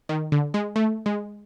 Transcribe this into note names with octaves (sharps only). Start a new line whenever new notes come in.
D#3
D3
G#3
A3
G#3